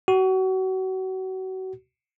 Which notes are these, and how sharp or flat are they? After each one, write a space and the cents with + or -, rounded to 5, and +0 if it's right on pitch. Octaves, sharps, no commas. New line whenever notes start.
F#4 +30